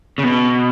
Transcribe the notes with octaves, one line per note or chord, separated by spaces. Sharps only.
C#3
B2